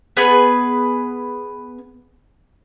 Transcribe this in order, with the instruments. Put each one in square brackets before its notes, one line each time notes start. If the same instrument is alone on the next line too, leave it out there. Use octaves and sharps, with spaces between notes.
[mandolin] B3 G#4 B4